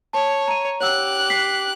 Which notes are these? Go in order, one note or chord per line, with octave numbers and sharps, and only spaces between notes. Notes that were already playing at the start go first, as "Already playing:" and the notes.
C#5 A5
A#5 D#7
G4 C#5 F#5 E6 F#6
B6 C7